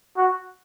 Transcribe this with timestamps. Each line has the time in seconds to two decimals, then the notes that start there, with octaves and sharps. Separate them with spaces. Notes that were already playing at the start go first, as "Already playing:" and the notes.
0.17 F#4